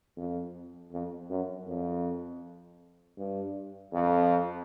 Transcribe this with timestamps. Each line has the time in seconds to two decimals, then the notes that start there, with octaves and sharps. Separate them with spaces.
0.17 F2
0.92 F2
1.30 F#2
1.67 F2
3.18 G2
3.93 F2